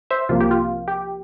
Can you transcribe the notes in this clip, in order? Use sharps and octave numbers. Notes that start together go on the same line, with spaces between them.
C5 E5
C2 C3 F3 A#3 F4
G4
F4
G4